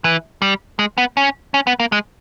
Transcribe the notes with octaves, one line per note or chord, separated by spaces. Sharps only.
E3
G3
G#3
B3
C#4
C#4
B3
A#3
G#3